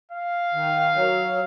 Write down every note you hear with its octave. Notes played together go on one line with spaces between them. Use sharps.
F5
D#3
F#3